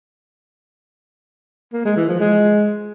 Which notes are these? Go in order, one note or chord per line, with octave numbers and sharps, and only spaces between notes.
A#3
G#3
E3
F3
G#3